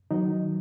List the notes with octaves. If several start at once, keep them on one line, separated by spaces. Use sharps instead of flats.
D#3 F#3 D#4